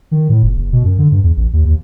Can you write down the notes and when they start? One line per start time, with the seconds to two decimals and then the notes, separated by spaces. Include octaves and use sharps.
0.11 D#3
0.29 A2
0.43 F#1
0.58 F#1
0.73 B2
0.84 F#2
0.98 D3
1.12 G2
1.23 E2
1.37 A1
1.53 D#2
1.65 D#2